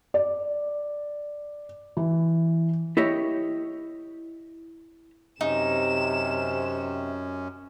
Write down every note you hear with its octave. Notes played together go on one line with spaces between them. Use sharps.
D5
E3
E4 G4 C#5 D#5
F#2 C3 C#4 D#4 E7